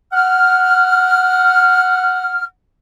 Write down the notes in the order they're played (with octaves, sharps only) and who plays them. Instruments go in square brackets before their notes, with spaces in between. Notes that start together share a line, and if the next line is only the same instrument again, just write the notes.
[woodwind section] F#5 F6